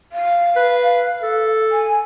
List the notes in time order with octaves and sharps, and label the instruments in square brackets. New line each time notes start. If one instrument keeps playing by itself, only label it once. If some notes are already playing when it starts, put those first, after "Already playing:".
[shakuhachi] F5
[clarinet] B4
A4
[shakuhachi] G#5